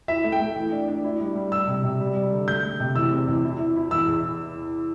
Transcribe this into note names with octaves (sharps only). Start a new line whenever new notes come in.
E4 E5
A3
G5
A3
E3
D4
D4
E4
G3
G3
G3 E6
C3
C3
G3
G3
D3
A3 G6
A3
C3
E2 E6
C4
E2
E4
E4
E4
E2 E6
E2